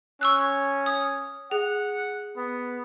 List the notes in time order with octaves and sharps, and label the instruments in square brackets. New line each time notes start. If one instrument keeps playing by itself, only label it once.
[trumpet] C#4 [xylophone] C#6 E6 F#6
[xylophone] D#6
[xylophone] G#4 [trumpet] F#5
[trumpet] B3